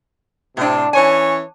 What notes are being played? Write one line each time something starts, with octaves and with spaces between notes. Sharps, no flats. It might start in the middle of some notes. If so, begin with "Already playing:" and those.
A2 C3 C4 D4
E3 C#4 C#5 G#5